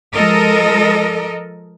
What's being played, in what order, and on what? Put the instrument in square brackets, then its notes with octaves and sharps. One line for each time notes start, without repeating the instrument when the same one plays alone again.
[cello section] F3 G#3 A4 A#4 D#5